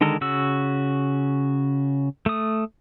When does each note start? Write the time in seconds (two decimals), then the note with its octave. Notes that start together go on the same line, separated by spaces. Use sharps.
0.01 D3 D#3 G#3 A4 A#4
0.21 C#3 F#4 E6
2.26 A3 D#6